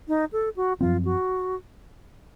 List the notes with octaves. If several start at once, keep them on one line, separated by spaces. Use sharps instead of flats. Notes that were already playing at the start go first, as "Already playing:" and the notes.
D#4
A4
F#4
F#2 F3 C4 F4
F#4